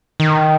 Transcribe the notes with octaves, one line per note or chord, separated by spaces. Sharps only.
D#3